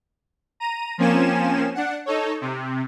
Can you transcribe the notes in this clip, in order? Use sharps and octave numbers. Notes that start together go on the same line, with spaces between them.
A#5 D#7
F3 A#3 C4 C#4 G#5 E7
D4 F#5
D#4 A4 C#5
C3